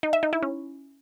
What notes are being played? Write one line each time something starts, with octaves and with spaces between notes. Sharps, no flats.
D#4
E5
D#4
E4
C#4